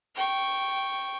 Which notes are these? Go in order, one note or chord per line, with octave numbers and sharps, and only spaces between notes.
G5 C#6